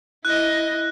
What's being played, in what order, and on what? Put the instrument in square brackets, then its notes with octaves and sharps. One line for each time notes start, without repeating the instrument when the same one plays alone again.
[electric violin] E4 D#5 [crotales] F#6